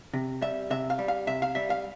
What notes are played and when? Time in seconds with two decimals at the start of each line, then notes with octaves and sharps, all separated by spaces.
0.14 C3
0.42 G3 E5
0.70 C3 E5
0.90 F5
0.99 G3
1.08 F5
1.27 C3 E5
1.42 F5
1.55 G3 E5
1.70 F5